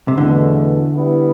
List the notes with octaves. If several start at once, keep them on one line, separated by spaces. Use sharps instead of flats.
C3
E2 B2 D3 A3
G3 B3 E4